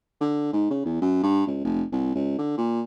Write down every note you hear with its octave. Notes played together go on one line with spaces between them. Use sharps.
D3
G#2
C#3
E2
F#2
G2
C#2
F1
C2
C#2
D3
A#2